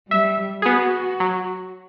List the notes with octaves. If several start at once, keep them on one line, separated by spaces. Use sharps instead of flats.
G3 E5
B3 F#4 G#4
F#3